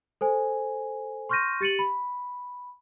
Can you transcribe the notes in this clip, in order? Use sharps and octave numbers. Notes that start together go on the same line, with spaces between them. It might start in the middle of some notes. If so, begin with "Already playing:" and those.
A4 C5 G#5
C6 C#6 F6 G6 A#6 D#7
G4 A6 C#7 D#7 F#7
B5